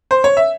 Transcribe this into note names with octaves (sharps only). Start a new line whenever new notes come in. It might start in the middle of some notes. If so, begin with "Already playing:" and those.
C5
C#5
E5